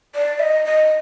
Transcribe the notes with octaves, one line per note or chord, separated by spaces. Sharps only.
D5
E5
D#5
D#5